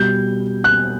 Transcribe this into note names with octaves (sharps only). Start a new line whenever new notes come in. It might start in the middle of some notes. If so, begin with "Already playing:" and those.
Already playing: B2 G3 G6
F#6